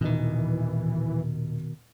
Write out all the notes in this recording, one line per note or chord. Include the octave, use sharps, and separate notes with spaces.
D#1 B2 D#3 E3 D#4